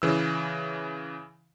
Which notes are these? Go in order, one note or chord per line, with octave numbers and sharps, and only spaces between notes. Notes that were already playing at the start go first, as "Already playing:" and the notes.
C#3 E3 E6